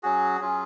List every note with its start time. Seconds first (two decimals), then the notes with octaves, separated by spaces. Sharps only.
0.03 F#3 C#4 F#4 G#4
0.41 F#3 C#4 F4